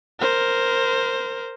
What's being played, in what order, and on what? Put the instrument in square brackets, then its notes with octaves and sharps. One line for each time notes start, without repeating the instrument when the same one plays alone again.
[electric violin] A#4 C5